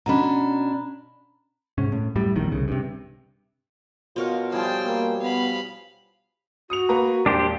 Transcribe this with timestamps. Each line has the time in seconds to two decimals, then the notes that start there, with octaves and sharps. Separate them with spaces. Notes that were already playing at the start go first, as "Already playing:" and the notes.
0.06 B2 C#4 D4 A#5 B5
1.78 G#2 C3 C#4
1.92 A2
2.16 F#2 A2 G3
2.36 A#1 E2 A2 D#3
2.51 C2 C#3
2.68 G2 C3
4.16 B2 F4 A#4 C5 C#5 F5 F#5
4.52 F3 G3 E4 G#4 C5 D5 G5 A5
4.86 A#3
5.22 B3 F5 B5
6.70 F#4 D#6 C#7 F7
6.89 A#3 B4 A#5
7.26 E1 A#2 D4 G4 C5